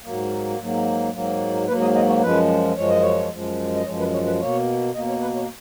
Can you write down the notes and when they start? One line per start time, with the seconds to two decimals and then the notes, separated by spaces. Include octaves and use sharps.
0.04 G#2 F#3 A#3
0.59 G#2 F#3 A#3
1.13 G#2 F#3 A#3
1.68 G#2 F#3 A#3 B4
1.82 D#5
1.96 D#5
2.09 C#5
2.22 F#2 F3 G#3 B4
2.76 F#2 F3 G#3 C#5
2.90 D#5
3.02 C#5
3.31 F#2 F3 G#3
3.76 D#5
3.86 F#2 F3 G#3 C#5
3.99 B4
4.13 C#5
4.26 B4
4.40 B2 A#3 C#5
4.94 B2 A#3 D#5
5.08 C#5
5.22 B4
5.36 C#5